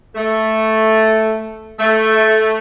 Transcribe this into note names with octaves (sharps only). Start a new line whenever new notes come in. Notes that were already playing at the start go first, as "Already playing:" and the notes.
A3
A3